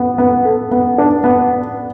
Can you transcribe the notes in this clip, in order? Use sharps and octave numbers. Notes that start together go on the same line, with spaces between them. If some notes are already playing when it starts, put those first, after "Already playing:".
Already playing: B3
B3
A4
B3
D4
B3